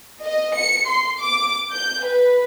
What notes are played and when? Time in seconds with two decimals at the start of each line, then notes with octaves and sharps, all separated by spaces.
0.24 D#5
0.57 C#7
0.88 C6
1.23 D6
1.71 G6
2.04 B4